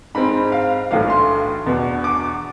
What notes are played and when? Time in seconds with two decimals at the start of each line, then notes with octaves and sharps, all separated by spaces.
0.15 G#2 G#3 C4 B5
0.52 F5
0.91 B1 A2 E3 A3 D4 F5
1.10 C6
1.66 E2 B2 B3 D4
2.04 D6